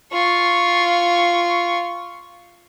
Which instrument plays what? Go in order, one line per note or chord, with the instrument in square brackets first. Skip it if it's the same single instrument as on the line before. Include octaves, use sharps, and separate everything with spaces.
[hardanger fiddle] F4 C#6